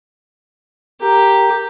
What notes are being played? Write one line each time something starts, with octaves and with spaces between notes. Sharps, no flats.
G4 A#4